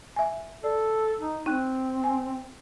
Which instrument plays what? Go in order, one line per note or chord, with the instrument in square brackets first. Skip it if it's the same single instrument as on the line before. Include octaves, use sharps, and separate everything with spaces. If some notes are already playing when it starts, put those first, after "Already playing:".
[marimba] E5 G#5
[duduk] A4 [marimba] D5
[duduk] D#4
[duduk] C4 [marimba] D#4 G5 F#6
[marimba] G#5